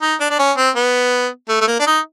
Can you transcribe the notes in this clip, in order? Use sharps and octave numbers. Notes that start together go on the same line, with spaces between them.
D#4
D4
D4
C#4
C4
B3
A3
A3
A#3
D4
D#4